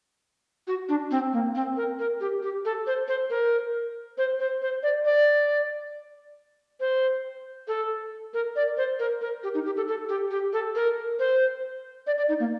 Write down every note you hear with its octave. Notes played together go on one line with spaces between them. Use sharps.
F#4
D4
C4
A#3
C4
A#4
A#4
G4
G4
A4
C5
C5
A#4
C5
C5
C5
D5
D5
C5
A4
A#4
D5
C5
A#4
A#4
G4
D#4
G4
A4
A4
G4
G4
A4
A#4
C5
D5
D5
D#4
A#3